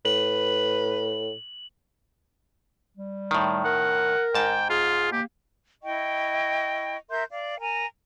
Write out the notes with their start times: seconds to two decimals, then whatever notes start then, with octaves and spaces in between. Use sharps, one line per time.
0.05 A2 B4 F#7
2.97 G3
3.31 A2 D#3
3.65 A#4 F#5
4.35 G#2 G5 A5
4.70 F4 G#4
5.12 A#3 G4
5.82 E4 D#5 G5 C#6
7.09 A#4 E5 C6 G6
7.30 D5 F5
7.59 A#4 G#5 A#5